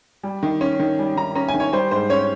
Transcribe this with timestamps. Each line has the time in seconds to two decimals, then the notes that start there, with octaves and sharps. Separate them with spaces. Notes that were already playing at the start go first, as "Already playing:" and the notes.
0.23 G3
0.43 D#3
0.61 C#4
0.79 D#3
0.99 G3
1.16 D#3 A#5
1.35 C#4 A#5
1.48 G#5
1.54 D#3
1.60 C#5
1.73 G3 C5
1.91 G#2 C5
2.09 C#4 C#5